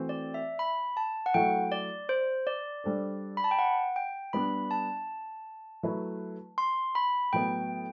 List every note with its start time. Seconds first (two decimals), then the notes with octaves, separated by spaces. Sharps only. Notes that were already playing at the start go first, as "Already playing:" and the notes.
Already playing: E3 A3 C4 F#4 C5
0.09 D5
0.34 E5
0.59 B5
0.97 A5
1.26 F#5
1.34 F#3 A3 E4 A4 G5
1.72 D5
2.09 C5
2.47 D5
2.84 G3 D4 A4 C5
3.37 B5
3.44 A5
3.51 G5
3.59 F#5
3.96 G5
4.33 G3 B3 D4 B5
4.71 A5
5.83 F#3 A3 E4 B4
6.58 C6
6.95 B5
7.33 A2 F#3 B3 G5